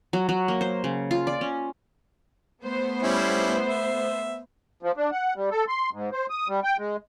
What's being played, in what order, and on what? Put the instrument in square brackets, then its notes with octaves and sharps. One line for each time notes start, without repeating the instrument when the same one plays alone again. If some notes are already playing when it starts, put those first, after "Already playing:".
[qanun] F#3
F#3
A#3
C5
C#3
F4
D5
C#4
[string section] A3 B3 C5
[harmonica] G3 C#4 E4
E5
[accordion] F3
D4
F#5
G3
A4
C6
G#2
C5
D#6
G3
G5
G#3